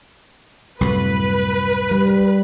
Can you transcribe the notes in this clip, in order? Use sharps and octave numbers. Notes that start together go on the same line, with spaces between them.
C2 F#2 A2 B4
G3